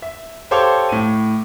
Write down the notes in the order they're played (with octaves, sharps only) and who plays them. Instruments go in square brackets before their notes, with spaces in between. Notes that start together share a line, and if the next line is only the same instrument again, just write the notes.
[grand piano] E5
G4 A4 C5 C#5 F5 D6
A2 D#7